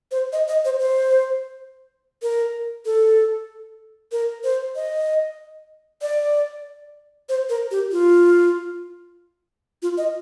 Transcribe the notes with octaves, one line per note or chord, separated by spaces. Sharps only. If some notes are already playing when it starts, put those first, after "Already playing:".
C5
D#5
D#5
C5
C5
A#4
A4
A#4
C5
D#5
D5
C5
A#4
G4
F4
F4
D#5